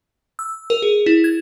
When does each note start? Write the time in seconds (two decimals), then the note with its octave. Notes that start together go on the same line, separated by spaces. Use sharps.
0.39 E6
0.70 A#4
0.82 G#4
1.06 E4
1.24 G#6